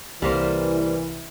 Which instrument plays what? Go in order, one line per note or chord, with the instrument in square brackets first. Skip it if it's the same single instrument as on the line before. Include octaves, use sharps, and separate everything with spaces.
[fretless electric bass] C2 [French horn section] E3 [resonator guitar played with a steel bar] G3 A#3 C5